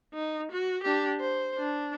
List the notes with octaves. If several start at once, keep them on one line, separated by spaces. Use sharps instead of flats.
D#4
F#4
D4 G4
C5
D4